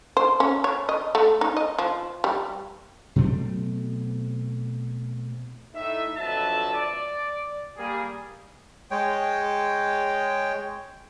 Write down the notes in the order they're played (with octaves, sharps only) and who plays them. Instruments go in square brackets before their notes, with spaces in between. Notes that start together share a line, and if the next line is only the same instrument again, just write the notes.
[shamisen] C5
C#4
C#5
D#5
A3
D#4
D#5
F3
G3
[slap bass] B2 F#3 A3 C4
[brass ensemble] A2 D#4 E5
F2 D3 F#3 B4 E5 A5
D5
G3 A#3 G#4
[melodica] G#3 C#5 G5